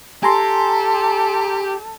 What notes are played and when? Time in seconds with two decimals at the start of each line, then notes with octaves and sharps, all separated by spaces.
0.23 G4 A4 G#5 A#5 C6